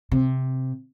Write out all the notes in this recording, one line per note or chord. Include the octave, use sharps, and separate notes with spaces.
C3